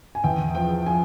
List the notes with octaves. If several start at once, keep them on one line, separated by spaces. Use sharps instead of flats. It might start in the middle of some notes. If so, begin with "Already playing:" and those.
G#5
E2 G5
F3 G5
F3 G#5